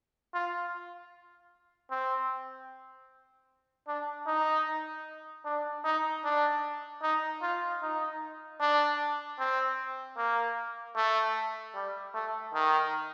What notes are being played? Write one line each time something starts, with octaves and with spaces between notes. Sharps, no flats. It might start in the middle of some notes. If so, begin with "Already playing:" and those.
F4
C4
D4
D#4
D4
D#4
D4
D#4
F4
D#4
D4
C4
A#3
A3
G3
A3
D#3